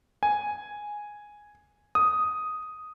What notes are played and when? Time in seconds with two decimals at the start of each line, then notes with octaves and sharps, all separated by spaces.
0.23 G#5
1.95 D#6